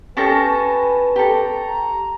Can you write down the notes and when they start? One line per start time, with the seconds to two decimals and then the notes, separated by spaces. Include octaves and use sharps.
0.17 C#4 G4 A4 B4 G#5 A5 C#6 A#6
1.16 G4 A4 A#5